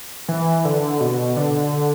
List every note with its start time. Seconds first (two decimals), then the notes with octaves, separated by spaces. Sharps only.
0.29 E3
0.65 D3
1.01 B2
1.37 D3